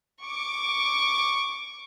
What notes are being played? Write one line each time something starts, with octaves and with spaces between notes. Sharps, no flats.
C#6 D6